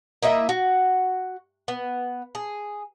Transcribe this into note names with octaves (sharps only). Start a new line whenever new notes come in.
A#3 E4 D#5 E5
F#4
B3
G#4